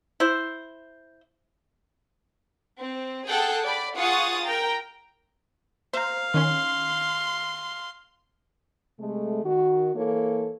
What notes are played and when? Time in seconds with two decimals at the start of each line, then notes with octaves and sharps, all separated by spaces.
0.20 E4 C5
2.80 C4
3.28 G#4 A4 F#5 G5 A5
3.65 D5 B5
3.95 F4 G#4 F#5 C#6 D#6 A6
4.45 A#4 G5 A#5
5.94 C5 F5 A#5
6.34 D#3 C#4 C6
8.99 C3 G#3 A3
9.44 D#3 F#4
9.96 E3 A#3 A4 C#5